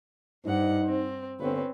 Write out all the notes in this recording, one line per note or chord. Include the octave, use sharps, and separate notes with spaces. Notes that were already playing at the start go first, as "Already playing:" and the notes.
G2 D#4 C5 F#5
C4
G1 C4 C#4 B4